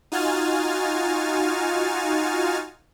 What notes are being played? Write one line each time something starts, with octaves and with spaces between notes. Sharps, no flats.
D#4 F4 F#4 G#5 F6 A6